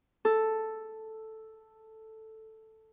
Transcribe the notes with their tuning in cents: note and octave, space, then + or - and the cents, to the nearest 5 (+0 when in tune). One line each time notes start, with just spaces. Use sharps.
A4 +0